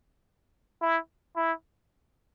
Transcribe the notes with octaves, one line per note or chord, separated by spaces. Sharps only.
E4
E4